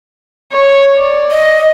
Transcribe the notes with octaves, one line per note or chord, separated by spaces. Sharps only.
C#5
D5
D#5